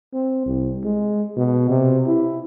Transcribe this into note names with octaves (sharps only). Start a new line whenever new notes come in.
C4
C2
G#3
B2
C3
E4